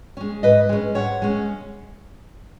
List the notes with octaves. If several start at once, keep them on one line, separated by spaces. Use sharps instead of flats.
G#3 C#4
G#2 B4 D#5
G#3 C#4
G#2 C#5 F#5
G#3 C#4